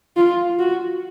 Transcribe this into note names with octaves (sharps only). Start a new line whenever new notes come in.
F4
F#4